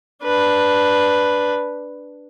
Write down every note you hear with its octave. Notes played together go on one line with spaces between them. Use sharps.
D4 B4